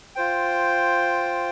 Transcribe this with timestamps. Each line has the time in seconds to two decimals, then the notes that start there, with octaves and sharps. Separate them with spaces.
0.16 F4 C5 G5